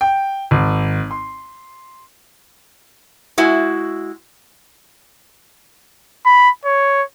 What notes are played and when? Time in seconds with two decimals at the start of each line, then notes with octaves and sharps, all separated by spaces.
0.01 G5
0.51 G#1
1.11 C6
3.38 G#3 E4 F#4
6.26 B5
6.65 C#5